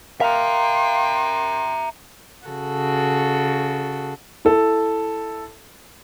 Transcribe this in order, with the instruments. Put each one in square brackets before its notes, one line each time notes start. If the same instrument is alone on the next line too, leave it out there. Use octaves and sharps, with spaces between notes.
[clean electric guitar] A#4 F5 [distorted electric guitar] E5 A#5 [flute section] G5 C6
[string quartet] C#3 F#4 A4
[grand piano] E4 A4